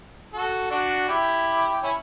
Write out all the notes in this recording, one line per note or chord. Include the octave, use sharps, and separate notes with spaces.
F#4 A4
D4 F#4
E4 G4
C#4 E4